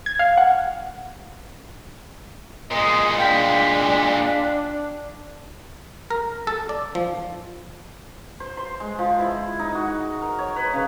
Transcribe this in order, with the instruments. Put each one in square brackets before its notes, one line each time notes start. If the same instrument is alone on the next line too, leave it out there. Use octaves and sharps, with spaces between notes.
[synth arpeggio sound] G#6
F5
F#5
[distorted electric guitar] A#2 G#3 [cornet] D#5
[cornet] D4 [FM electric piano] F5 G5 B6
[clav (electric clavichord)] A#4
A4
D5
F3
[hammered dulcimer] C5
C6
G#3
F3
E4
D#4
F#4
A#4
C#5
B4
C#3